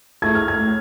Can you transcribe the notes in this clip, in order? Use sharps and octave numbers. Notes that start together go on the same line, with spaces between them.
A3 E4 G#4 G#6
F6
G#6
A2